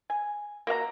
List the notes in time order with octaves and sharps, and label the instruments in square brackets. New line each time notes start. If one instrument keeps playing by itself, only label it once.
[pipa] G#5
A#3 F#4 F5 A#5